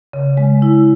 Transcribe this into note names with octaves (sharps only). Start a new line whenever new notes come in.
C#3
G#3
E4